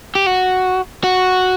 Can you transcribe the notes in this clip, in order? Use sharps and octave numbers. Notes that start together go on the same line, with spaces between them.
G4
F#4
F#4